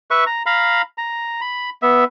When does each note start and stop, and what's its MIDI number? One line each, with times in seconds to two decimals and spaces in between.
0.11 0.24 71
0.11 0.24 76
0.11 0.24 85
0.26 0.43 82
0.46 0.82 77
0.46 0.82 82
0.46 0.82 83
0.98 1.41 82
1.41 1.70 83
1.82 2.04 59
1.82 2.04 76